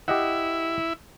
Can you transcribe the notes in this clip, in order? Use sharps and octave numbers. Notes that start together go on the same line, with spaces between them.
E4 G4 D#5 F#5